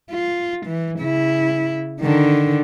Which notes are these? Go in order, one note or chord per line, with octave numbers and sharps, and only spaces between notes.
F4
E3
C#3 E4
D3 D#3